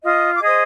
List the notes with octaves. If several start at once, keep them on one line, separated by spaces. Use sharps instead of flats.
F4 D#5 D#6
D6
G#4 C5 D#5 D#6